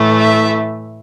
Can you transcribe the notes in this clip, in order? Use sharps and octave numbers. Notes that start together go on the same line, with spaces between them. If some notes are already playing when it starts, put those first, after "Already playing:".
Already playing: A2 E3 A3
E5